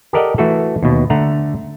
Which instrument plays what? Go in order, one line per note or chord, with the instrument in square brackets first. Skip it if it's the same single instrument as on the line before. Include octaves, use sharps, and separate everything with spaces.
[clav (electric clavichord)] G4 A4 A#4 D5 D#5 F#5
E3 A3 F#4 A4
D#2 B2
D3 A3 F#5 A#5